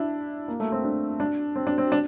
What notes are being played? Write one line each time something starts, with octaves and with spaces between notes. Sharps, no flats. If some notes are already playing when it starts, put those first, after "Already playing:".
Already playing: D4 E4
A#3
A3
C4
D4
D4
C4
D4
C4
D4